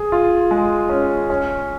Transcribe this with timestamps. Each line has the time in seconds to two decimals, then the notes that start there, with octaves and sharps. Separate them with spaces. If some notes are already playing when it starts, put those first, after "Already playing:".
Already playing: G#4
0.12 F4
0.51 G#3
0.89 C#4
1.30 C#4